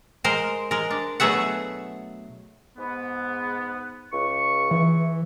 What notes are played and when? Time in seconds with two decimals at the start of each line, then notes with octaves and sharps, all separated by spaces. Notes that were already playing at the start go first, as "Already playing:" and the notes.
0.24 G#3 A#4 C5
0.71 G#3 A#4
0.91 D4
1.20 B2 F#3 A3 G#4 E5 F#5
2.77 G#2 B3
4.12 C#2 C#6
4.71 E3